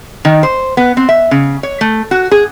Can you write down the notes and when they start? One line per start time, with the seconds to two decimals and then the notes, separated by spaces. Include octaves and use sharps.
0.25 D#3
0.43 C5
0.77 B3
0.97 C4
1.09 E5
1.31 C#3
1.63 C#5
1.81 A3
2.11 F#4
2.31 G#4